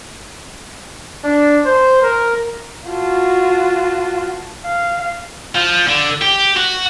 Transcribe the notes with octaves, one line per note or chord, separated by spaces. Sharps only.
D4
C5
A#4
F4 F#4 A5
F5
F3
D3
G4
F#4